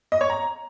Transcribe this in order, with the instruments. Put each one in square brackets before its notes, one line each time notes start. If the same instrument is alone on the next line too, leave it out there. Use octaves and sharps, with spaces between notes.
[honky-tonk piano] D#5
C#5
A#5